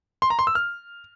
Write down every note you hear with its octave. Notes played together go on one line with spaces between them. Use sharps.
C6
A#5
C6
E6
F6